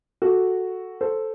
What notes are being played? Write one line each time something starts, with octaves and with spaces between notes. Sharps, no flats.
F#4 A4
A4 C5